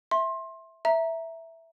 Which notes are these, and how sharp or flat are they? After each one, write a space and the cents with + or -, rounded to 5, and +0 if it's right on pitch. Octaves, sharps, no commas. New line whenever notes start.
E5 -5 C6 +25
E5 +0 A#5 +0